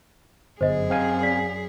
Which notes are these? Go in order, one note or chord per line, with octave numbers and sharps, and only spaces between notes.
G1 F#2 G#4 C5 D#5
C4 F5 G#5
D5 B6